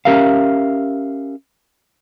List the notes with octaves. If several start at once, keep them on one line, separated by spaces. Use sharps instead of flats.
C#4 G4 A#4 E5 F5